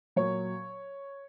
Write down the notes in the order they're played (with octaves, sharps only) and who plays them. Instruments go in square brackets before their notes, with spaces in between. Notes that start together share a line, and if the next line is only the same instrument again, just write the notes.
[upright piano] A#2 F#3 C#5